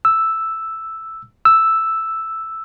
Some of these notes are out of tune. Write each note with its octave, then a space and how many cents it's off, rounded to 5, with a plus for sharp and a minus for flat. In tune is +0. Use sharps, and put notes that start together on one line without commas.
E6 +0
E6 +0